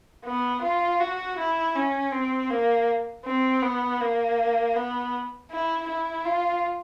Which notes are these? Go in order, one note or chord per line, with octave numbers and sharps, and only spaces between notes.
B3
F4
F#4
E4
C#4
C4
A#3
C4
B3
A#3
B3
E4
E4
F4